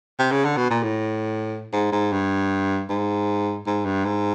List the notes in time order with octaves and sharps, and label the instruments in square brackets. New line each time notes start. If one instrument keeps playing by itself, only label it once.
[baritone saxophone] C3
C#3
D3
B2
A#2
A2
G#2
G#2
G2
G#2
G#2
G2
G#2